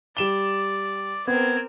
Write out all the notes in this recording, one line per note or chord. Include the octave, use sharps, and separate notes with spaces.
G3 D5 E7 G7
B3 C4 A#4 G#6